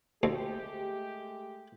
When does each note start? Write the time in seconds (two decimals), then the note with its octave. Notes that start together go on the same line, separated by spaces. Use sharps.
0.23 D2 G#3 A3 G4